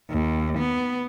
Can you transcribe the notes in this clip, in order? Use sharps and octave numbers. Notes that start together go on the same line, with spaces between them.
D#2
B3